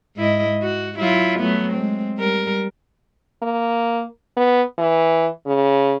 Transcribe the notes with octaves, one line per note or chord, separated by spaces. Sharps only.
G#2 E4 D#5
F#4
F#3 E4 F4
F#3 A3 B3
G#3 C4
G3 A#4
A#3
B3
E3
C#3